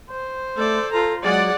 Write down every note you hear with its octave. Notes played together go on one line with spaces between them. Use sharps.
C5
A3 A4 D5
F4 A4 A#5
F#3 G#3 D5 F#5